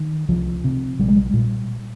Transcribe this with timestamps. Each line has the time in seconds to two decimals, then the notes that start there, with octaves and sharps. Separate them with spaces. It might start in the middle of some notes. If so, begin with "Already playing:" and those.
Already playing: D#3
0.28 C2 F3
0.64 C3
0.99 A#1 G3
1.08 G#3
1.16 G3
1.33 A#2